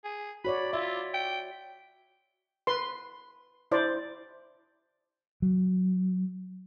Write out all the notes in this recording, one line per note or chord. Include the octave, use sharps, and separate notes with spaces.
G#4
F#4 C#5 D5 B5
F4 E5
G5
B4 C6
E4 C5 D5
F#3